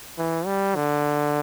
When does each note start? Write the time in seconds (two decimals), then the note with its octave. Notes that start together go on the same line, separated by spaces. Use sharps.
0.18 E3
0.46 G3
0.75 D3